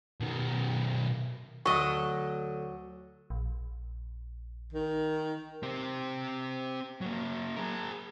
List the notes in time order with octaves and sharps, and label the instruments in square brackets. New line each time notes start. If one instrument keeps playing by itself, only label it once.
[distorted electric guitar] B2 D#3
[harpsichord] D2 [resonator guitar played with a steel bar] F#3 [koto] A4 D#5 [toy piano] C#6
[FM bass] A#1
[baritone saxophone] D#3
[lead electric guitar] C4 G4
F#3 A#3
G#4 A#4